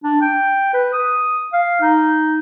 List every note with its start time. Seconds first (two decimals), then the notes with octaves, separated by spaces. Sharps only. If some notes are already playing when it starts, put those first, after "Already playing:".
0.04 D4
0.21 G5
0.73 B4
0.93 D#6
1.53 F5
1.81 D#4